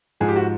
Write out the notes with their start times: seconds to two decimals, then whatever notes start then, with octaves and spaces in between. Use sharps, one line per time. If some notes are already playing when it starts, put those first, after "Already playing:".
0.20 G#2 F3 G#4
0.28 G4
0.36 F#4